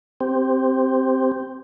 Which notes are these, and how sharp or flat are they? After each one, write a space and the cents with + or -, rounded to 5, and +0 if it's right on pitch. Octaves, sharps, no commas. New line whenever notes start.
C4 +0 G4 +0